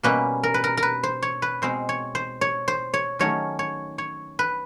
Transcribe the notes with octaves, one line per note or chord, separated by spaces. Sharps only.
B2 G3 A#3 C#4 B4
A#4
B4
A#4
A#4
B4
C5
C#5
B4
B2 G#3 C4 C5
C#5
C5
C#5
C5
C#5
D#3 F#3 A3 C#4 C#5
C#5
C#5
B4